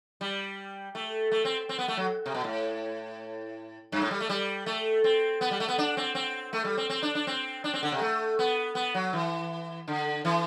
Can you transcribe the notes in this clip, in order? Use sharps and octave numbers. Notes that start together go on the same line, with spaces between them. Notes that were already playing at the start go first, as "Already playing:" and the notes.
G3
A3
A3
C4
C4
B3
A3
F#3
C3
B2
A2
G2
A2
G3
A3
G3
A3
C4
B3
G3
A3
B3
D4
C4
C4
A3
G3
C4
C4
D4
D4
C4
D4
C4
D3
C3
A3
B3
B3
F#3
E3
D3
E3